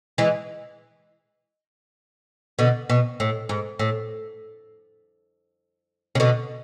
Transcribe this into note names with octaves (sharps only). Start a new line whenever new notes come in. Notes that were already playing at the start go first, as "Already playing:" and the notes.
E3 G#3
B2 D3
B2
A2
G#2
A2
C#3
B2 D3